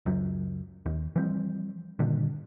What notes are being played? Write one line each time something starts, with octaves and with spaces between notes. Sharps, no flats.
C#2 F#2 F#3
D#2
E3 F3 G3 C4
G2 A#2 D3 D#3